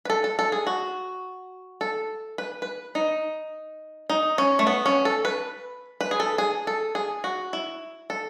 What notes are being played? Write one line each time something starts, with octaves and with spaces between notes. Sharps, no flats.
B4
A4
A4
A4
G#4
F#4
A4
B4
B4
D#4
D#4
C#4
A3
B3
C#4
A4
B4
B4
G#4
A4
G#4
A4
G#4
F#4
E4
A4